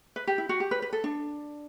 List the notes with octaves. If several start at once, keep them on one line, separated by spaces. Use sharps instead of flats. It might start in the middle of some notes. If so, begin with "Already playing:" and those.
B4
G4
E4
F#4
G4
B4
B4
A4
D4